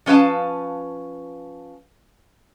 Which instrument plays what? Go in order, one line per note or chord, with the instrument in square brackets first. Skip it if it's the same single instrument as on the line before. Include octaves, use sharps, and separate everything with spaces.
[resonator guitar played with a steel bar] F3 C#4 B4 F5 A5